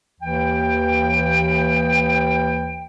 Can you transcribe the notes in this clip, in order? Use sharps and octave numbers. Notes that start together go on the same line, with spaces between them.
D#2 E3 G5